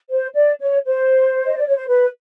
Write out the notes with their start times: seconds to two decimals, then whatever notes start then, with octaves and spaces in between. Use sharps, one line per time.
0.09 C5
0.34 D5
0.60 C#5
0.85 C5
1.45 D#5
1.55 D5
1.66 C#5
1.76 C5
1.87 B4